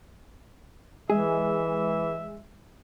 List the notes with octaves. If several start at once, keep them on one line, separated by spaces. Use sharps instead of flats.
E3 G#3 G#4 E5